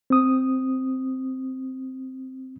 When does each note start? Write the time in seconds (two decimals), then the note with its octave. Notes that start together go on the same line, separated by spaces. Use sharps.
0.10 C4 D#6